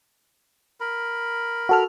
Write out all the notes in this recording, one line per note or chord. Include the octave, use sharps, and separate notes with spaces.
A#4 B5
F#4 A4 F6